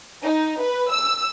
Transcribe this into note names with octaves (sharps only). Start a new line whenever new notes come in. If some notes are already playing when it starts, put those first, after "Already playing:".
D#4
B4
E6